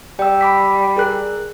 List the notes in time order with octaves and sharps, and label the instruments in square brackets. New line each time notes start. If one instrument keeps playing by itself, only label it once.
[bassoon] G3 [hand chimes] G5 E6
[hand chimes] B5 D6 B6
G#4 A#4 F#6